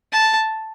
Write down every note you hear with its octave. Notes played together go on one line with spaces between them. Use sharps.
A5